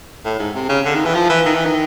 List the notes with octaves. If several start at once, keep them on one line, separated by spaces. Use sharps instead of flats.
A2
G#2
C3
C#3
D3
D#3
E3
F3
E3
D#3
E3
D#3